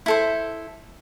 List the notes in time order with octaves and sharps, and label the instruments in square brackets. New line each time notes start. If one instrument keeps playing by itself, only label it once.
[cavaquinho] E4 A4 C5